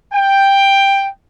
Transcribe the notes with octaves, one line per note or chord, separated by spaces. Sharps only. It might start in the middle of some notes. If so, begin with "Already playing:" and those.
G5